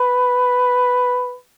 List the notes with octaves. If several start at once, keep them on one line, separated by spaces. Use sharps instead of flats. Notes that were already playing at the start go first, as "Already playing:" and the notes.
Already playing: B4